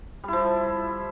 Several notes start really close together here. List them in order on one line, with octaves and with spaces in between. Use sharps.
G3 E4 F3